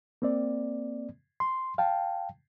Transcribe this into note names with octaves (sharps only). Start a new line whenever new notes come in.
A#3 C4 D5
C6
F5 G5 A5